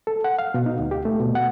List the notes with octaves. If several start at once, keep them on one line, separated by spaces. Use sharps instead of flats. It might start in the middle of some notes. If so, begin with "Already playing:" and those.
A4
F#5
F5
B2
D#4
D2
G4
A3
B2
F#5